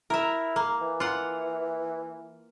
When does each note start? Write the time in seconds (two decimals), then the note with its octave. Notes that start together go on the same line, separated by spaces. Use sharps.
0.10 E4 A#4 E5
0.56 A#3
0.81 E3
1.00 F4 F#5